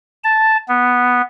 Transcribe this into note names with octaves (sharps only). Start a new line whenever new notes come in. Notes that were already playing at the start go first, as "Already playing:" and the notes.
A5
B3